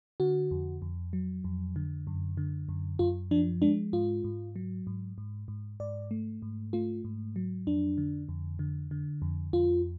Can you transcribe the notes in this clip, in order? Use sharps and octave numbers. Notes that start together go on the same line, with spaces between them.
D3 F#4
F2
F2
F#3
F2
D3
F#2
D3
F#2
F#2 F4
F3 D4
G#3 D4
G#2 F4
G#2
F#3
G#2
G#2
G#2
G#2 D5
A3
G#2
A3 F4
G#2
F#3
F2 D4
D3
F2
D3
D3
F2
F2 F4